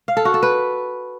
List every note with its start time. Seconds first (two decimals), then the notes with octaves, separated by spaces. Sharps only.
0.08 F5
0.17 A4
0.25 F#4
0.34 A4
0.43 B4